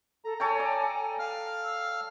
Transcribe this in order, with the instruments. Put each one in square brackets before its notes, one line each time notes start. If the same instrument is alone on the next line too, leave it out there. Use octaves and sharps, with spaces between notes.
[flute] A4 [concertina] A#5
[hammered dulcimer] A4 C#5 G5 [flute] G#5
[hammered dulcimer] D5
[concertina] F5 F6
[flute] E6